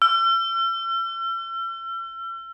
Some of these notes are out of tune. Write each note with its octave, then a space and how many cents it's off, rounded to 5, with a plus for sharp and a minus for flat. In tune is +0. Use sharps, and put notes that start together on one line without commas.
E6 +45